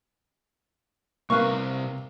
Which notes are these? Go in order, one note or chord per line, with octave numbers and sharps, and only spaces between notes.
C2 C3 A#3 B4 F5 C#6